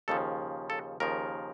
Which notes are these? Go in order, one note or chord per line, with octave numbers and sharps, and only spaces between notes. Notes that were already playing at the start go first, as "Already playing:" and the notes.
D#2 C#3 F3 A4
A4
D#2 C#3 F3 A#4